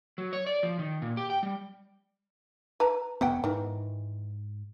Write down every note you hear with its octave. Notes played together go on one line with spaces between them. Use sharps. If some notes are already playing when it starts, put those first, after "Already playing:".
F#3
C#5
D5
F3
D#3
A#2
G4
G5
G3
B4 A5 A#5
E1 F#2 B3 C#4 F#5 G5
G#2 D#3 E3